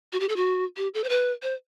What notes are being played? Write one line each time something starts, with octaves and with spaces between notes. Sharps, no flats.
F#4
G4
A4
F#4
G4
A4
C5
B4
C5